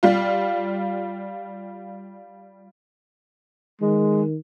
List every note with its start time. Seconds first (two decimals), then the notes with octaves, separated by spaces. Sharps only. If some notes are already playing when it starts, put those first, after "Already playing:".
0.03 G3 F4
3.81 D#3 G#3